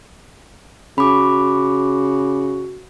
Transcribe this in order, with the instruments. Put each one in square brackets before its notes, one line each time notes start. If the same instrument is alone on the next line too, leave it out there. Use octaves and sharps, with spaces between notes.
[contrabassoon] C#3 [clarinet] F#4 [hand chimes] B5 D6